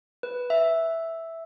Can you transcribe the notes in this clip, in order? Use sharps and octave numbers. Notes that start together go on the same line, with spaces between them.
B4
E5